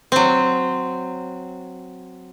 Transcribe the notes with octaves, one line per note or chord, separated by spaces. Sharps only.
F#3 C4